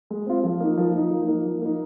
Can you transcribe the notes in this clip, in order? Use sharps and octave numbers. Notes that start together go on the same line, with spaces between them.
G#3
C4 F4
F3
A#3 D#4
F3
A#3 D#4
F3
A#3 D#4
F3
A#3 D#4